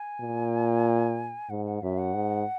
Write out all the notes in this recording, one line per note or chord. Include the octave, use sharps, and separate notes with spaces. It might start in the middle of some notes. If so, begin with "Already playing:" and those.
Already playing: G#5
A#2
G#2 F#5
F#5
F#2 E5
F#5
G#2